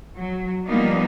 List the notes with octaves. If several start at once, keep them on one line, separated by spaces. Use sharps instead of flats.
F#3
F3 G3 A#3 B3 D4 D#4